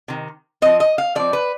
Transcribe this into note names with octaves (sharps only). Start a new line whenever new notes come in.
C3 D#3
F3 C4 D#5
D#5
F5
F3 C4 D5
B4